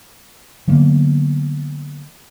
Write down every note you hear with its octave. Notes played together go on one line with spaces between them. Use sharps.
D3 F#3 A#3 B3